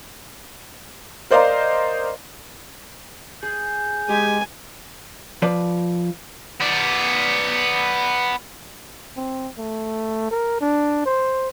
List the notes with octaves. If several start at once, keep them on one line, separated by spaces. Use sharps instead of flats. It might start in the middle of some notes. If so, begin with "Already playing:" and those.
A#4 C5 D5 D#5 F5 A#5
G#4 G6
G#3 G4 G#5
F3 B4 D5
B3 D5
C4
A3
A#4
D4
C5